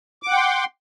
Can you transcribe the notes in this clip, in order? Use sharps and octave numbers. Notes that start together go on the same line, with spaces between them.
F#5 G5 C6 D6